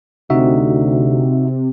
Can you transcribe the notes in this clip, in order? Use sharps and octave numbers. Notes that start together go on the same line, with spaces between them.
D2 C3 D#4 F#4 E5